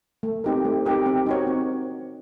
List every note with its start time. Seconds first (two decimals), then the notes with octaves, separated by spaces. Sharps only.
0.23 A3
0.44 C4 D#4 G4 A#4
0.65 A3
0.86 C4 D#4 G4 A#4
1.06 C4
1.26 D#4 F#4 A#4 C#5
1.47 C4